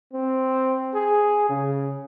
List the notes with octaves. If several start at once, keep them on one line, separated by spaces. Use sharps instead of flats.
C4
G#4
C#3